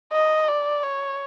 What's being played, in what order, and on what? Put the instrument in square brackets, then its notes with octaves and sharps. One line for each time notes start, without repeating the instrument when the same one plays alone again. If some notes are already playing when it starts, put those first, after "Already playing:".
[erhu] D#5
D5
C#5